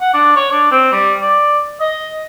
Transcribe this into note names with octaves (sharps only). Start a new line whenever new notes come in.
F#5
D4
C#5
D4
C4
G3
D5
D#5